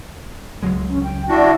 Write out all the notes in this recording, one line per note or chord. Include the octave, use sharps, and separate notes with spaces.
C#2 F#3 G#3
C#4
G5
D4 E4 F#4